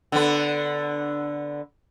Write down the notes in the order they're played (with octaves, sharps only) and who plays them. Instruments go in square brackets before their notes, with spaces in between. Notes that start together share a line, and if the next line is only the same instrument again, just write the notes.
[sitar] D3 B3